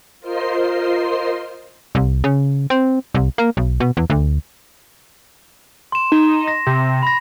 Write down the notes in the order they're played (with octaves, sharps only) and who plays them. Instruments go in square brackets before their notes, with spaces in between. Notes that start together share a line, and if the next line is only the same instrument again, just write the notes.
[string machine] F4 A#4 C5 D#5 C6 C7
[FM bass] C2
C#3
C4
C2
A#3
B1
B2
E2
D2
[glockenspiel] C6 E7
[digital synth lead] D#4
[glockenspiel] A#6
[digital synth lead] C3
[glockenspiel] B5 A#6